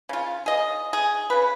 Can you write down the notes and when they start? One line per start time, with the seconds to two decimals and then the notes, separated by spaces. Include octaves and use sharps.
0.09 C#3 F4
0.46 G#4 D#5
0.93 G#4
1.30 C#3 B4